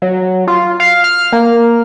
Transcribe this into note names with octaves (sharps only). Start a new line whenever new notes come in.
F#3
F4
F5
F6
A#3